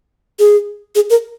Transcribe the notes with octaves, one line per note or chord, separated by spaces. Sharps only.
G#4
G#4
A#4